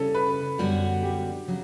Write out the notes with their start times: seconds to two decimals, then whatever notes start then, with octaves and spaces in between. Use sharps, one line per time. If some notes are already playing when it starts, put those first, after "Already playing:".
Already playing: C#3 G3 C#4 A4
0.15 B4
0.58 F#2 D3 G3 B3 F#4
1.03 G4
1.48 C#3 F#3